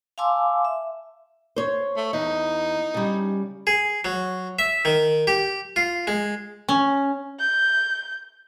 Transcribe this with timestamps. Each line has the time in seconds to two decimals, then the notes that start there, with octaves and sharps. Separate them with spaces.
0.18 F5 G#5 A5 C6 D6 E6
0.65 E5
1.56 C5 C#5
1.97 A3
2.13 E2 D#4
2.94 C#3 G3
3.67 G#4
4.05 F#3
4.59 E5
4.85 D#3
5.27 G4
5.76 F4
6.07 G#3
6.69 C#4
7.40 G6